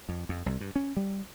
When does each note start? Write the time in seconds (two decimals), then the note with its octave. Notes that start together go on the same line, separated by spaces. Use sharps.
0.09 F2
0.29 F2
0.46 C2
0.61 G2
0.76 C#4
0.97 G3